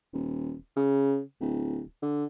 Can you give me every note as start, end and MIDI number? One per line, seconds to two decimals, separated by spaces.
0.13 0.55 27
0.76 1.20 49
1.40 1.82 26
2.02 2.25 50